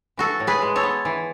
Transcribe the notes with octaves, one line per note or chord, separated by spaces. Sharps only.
E3 F#4 A4
A2
G#4 B4
G#3
A4 C#5
B3
E3